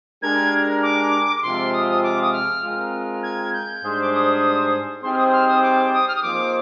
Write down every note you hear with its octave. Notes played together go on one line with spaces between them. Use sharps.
G#3 D4 G4 A#4 G#6
D6
D6
C3 F3 G#3 C4 F4 C6
D#6
D#6
D6
D#6
F6
G#3 C4 F4 A#4
G#6
G6
G#2 G3 D4 G#4 C5
D6
D#6
G3 C4 D#4 G#4 C5 C6
F6
D#6
D#6
F6
D#6
D6
D#6
F6
D#6
F3 A#3 D#4 G#4 C5 D6